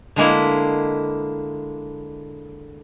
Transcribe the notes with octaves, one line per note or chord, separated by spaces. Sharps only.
D3 G#3 A#3 E4